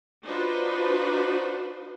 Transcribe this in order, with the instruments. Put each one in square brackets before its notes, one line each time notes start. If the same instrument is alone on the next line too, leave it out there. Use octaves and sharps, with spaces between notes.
[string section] D4 D#4 F4 F#4 B4 C5